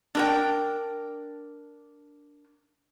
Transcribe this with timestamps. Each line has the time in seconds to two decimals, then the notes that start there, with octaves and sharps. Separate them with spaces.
0.15 D4 A#4 G5